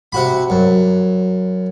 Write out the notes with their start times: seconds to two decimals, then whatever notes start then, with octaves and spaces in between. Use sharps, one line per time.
0.12 C3 F#4 B5
0.50 F#2